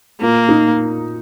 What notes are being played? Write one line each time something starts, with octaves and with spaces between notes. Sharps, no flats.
A#2 A#3
D#4